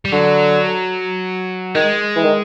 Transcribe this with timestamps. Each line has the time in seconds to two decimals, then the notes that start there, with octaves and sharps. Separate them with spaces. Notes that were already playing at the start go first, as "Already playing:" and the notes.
0.05 G3
0.12 D3 F#3
1.75 D#3 G#3
2.16 E3
2.24 D#3